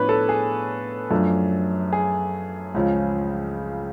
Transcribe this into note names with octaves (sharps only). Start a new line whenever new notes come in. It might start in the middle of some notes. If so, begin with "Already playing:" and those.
Already playing: A2 F3 B3 D4 B4 C#5
A4
G#4
F#2 F3 A3 D4
G#4
C#2 C#3 F3